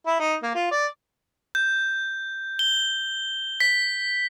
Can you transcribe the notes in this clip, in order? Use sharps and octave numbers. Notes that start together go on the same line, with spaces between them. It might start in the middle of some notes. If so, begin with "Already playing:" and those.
E4
D#4
A#3
F4
D5
G6
G7
B6